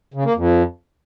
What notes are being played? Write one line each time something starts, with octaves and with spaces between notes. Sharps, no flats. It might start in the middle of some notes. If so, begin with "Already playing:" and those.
C#3
A#3
F2